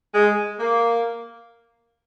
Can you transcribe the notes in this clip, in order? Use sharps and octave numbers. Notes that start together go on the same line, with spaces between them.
G#3
A#3